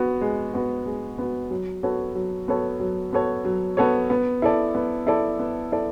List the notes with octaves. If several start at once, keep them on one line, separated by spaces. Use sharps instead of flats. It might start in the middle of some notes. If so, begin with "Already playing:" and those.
Already playing: B3 F#4
G#3
B3 F#4
G#3
B3 F#4
F#3
B3 F#4 A4 C#5
F#3
B3 F#4 A4 C#5
F#3
B3 F#4 A4 C#5
F#3
B3 F#4 A4 C#5
B3
E4 A4 D5
B3
E4 A4 D5
B3
E4 A4 D5